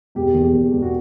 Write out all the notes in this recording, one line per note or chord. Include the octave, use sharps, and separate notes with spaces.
E1 G4
E2
E2
E1
F#4